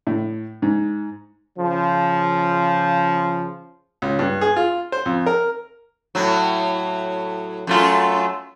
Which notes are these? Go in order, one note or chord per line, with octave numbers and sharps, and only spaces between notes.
A2
G#2
C#3 F3
C#2
G2
G#4
F4
C5
F2
A#4
A2 F#3
F#2 A3 F4